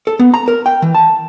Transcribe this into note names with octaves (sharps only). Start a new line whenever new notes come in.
A4
B3
A#5
A#4
G5
E3
A5